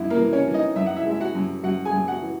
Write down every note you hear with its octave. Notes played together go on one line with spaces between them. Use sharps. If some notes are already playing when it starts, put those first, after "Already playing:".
Already playing: F#2 D#4 E4
A#3 A#4
E3
C#4 C#5
E3
D#4 D#5
F#2 E5
F#5
E4 E5
G#3
E5
F#4 F#5
F#2
F#2 F#4 F#5
G#4 G#5
F#2
F#4 F#5
E3